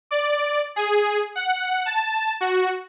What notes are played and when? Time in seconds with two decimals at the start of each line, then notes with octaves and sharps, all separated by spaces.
0.11 D5
0.76 G#4
1.35 F#5
1.86 A5
2.41 F#4